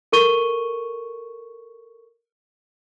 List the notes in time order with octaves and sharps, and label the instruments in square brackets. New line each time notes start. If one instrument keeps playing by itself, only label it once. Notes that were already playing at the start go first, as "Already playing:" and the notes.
[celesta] A4 A#4 C#6 D#7 G7